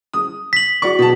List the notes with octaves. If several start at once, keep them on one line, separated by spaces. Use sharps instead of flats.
D#6
B6 F#7
F#4 D5 C#6
B2 A5